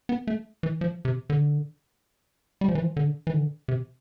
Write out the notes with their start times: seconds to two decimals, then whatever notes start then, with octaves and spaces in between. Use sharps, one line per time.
0.09 B3
0.27 A3
0.63 E3
0.81 F3
1.05 C3
1.30 D3
2.61 G3
2.69 F3
2.75 E3
2.82 F3
2.97 D3
3.27 E3
3.33 D3
3.68 C3